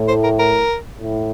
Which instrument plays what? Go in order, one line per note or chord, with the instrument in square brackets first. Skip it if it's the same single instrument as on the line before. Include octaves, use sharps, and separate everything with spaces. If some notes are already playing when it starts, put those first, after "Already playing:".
Already playing: [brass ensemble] A2
[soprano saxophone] C5
A#4
A#4
[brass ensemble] A2